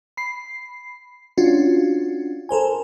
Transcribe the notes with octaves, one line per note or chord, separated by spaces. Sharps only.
B5 C7
C#4 D4 F4 F#4
A4 A#4 C5 G#5